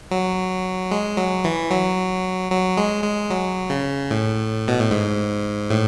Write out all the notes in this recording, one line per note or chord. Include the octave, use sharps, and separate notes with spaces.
F#3
G#3
F#3
E3
F#3
F#3
G#3
G#3
F#3
C#3
A2
B2
A2
G#2
A2